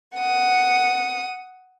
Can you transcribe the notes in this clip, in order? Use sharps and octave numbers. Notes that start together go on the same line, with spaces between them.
F#5 D#6